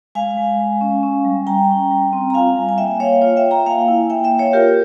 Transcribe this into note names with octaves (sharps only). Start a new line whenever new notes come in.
G#3 F5 G#5
G#3
G#3
C#4
C#4
G3
G3 G5 A#5
C#4
G3
C4
A#5
F4 F5 G#5
G3
G#5
A#3 E5 G5
A#3 C#5 F5
F4 C#5 F5
E5 G5
F4
G5 A#5
A#3 F5 G#5
E4
A#3 E5 G5
E5 G5
A#3
C#5 F5
F4 G4 A#4